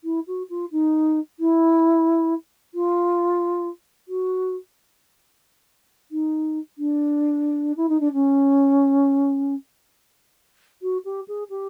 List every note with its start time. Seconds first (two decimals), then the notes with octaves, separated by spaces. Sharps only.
0.04 E4
0.27 F#4
0.50 F4
0.72 D#4
1.40 E4
2.74 F4
4.08 F#4
6.11 D#4
6.78 D4
7.77 E4
7.89 D#4
8.00 D4
8.13 C#4
10.82 F#4
11.05 G4
11.28 G#4
11.50 G4